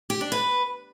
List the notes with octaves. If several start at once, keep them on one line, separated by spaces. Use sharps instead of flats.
G4
D4
B4